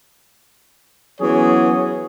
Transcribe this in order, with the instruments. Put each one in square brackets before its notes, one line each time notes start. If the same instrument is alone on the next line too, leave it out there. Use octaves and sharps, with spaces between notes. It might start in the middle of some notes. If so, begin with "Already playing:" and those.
[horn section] E3 F#3 B3 C#4 G#4 C#5